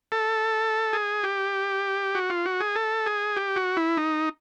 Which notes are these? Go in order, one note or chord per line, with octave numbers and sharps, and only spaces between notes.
A4
G#4
G4
F#4
F4
F#4
G#4
A4
G#4
G4
F#4
E4
D#4